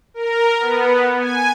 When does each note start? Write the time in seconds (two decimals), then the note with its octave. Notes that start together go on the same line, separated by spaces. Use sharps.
0.14 A#4
0.59 B3
1.19 G#5